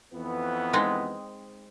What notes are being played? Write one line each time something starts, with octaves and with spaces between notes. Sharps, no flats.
F2 E3 B3
G#3 C4 D#4